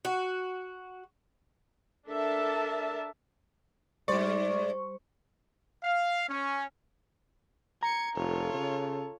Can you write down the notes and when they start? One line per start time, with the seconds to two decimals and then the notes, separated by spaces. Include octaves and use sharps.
0.05 F#4
2.07 D4 A4 A#4 E5 A5
4.08 G#2 G3 C5 D5 C#6
5.83 F5
6.29 C#4
7.83 A#5 G#6 C#7
8.16 F1 F4 A4 C#5
8.54 C#3